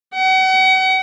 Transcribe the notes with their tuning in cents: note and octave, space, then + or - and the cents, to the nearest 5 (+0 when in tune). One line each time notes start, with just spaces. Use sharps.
F#5 +35